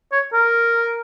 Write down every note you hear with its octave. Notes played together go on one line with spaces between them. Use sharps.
C#5
A#4